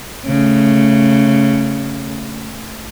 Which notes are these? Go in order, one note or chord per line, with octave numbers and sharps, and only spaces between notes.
C#3 A3